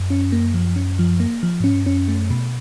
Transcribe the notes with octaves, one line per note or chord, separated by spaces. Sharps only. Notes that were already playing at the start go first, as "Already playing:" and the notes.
Already playing: F#2
C#4
A#3
F3
C#4
F3
A#3
F3
G#2 C#4
G2
F#2 C#4
A3
B2